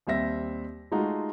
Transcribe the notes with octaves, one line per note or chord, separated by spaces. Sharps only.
D#2 G3 C4 E5 A#6
G#3 A3 D#4 F4 F#4